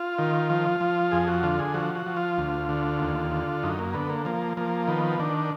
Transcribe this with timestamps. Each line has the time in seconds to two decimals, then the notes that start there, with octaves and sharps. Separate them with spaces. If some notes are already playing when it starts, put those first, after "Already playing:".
Already playing: F4
0.19 D#3
0.50 F3
0.80 F3
1.11 F2 G#4
1.28 F#4
1.43 D3 F4
1.59 G#4
1.74 F3 F#4
1.95 F#4
2.06 F3
2.16 F4
2.38 D2
2.69 D3
3.00 D#2
3.31 D3
3.63 F#2 D#4
3.79 A#3
3.94 D3 B3
4.09 A#3
4.25 F3 A#3
4.57 F3 A#3
4.88 D#3 B3
5.19 D#3 D4